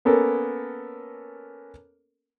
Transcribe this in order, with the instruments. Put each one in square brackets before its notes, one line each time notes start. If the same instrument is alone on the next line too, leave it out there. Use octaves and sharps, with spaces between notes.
[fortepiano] A#3 B3 C#4 A4 A#4